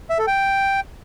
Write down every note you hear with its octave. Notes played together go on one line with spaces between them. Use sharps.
E5
A4
G5